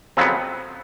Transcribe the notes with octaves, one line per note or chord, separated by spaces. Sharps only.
F2 C#3 F#3 B3 C4